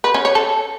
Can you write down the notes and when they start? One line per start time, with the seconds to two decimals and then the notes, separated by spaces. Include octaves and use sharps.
0.04 B4
0.14 C#4
0.25 C#5
0.35 A4